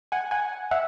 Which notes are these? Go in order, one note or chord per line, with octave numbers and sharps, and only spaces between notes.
F#5 G#5
F#5 G#5
E5 F#5